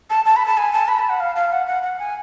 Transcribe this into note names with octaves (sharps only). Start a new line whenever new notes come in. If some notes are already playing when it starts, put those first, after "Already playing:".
A5
A5
B5
A5
G#5
A5
B5
A5
F#5
F5
F5
F#5
F#5
F#5
G#5